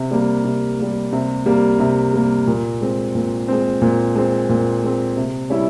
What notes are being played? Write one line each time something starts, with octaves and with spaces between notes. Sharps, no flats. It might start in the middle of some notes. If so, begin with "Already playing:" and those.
Already playing: C3
G3 A#3
C3
G3 A#3
C3
G3 A#3
C3
G3 A#3
A#2
G#3 C4
A#2
G#3 C4
A#2
G#3 C4
A#2
G#3 C4
C3
G3 C#4 E4